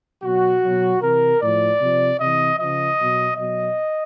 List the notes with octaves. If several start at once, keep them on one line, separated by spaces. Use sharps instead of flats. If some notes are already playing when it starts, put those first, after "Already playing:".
B2 F#3 F#4
B2 F#3
C3 E3 A#4
A2 F3 D5
C3 F3
C3 E3 D#5
C#3 F3 D#5
B2 F#3
B2 F#3 D#5